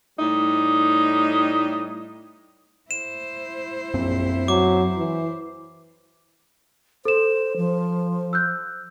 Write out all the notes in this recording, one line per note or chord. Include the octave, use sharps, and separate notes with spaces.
A2 G3 D#4
E4 C5 E7
A#1 F#2 A#3 C4
F#3 D6
E3
A4 C5 E7
F3
E6 F#6 G6